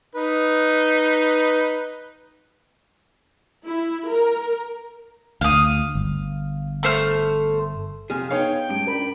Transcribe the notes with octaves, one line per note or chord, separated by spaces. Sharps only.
D#4 B4
E4
A#4
D2 F5 D#6
G1
A3 C5 F6
F2 C3 G#4 F6
B3 D#4 G#4 C#5 F5 G5 G#6
G2 C#4 D7
D4 A#4 B5